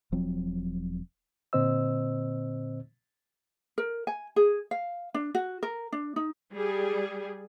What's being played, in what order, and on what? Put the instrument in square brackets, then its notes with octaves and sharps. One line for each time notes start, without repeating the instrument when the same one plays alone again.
[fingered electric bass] E1 F3 F#3 C4
[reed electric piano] A#2 D3 C4 C5 D#5 E6
[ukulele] A#4
G#5
G#4
F5
D4
F#4
A#4
D4
D#4
[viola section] G3 G#4